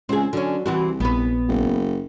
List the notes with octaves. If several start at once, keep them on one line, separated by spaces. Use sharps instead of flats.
C#2 C4 G#4
D3 F#3 C#4
C2 E3 C4 F#4
A#1 B3 B4
F#1